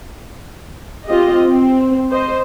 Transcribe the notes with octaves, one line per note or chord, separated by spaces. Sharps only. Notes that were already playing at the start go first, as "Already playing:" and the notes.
C4 F4 G4 D#5
C4
C5 D#5